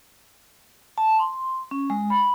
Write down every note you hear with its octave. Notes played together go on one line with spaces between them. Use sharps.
A5
C6
C#4
G#3
B5